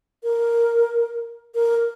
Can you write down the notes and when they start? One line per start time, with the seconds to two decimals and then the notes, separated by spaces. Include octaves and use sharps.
0.23 A#4
1.55 A#4